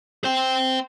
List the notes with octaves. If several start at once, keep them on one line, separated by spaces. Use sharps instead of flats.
C5 G5